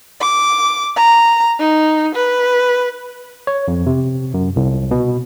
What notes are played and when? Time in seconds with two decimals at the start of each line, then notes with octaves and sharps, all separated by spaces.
0.20 D6
0.96 A#5
1.60 D#4
2.15 B4
3.47 C#5
3.68 F2
3.86 C3
4.34 F#2
4.56 C2
4.91 B2